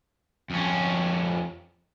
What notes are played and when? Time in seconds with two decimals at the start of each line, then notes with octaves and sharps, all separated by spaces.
0.50 F2 C#4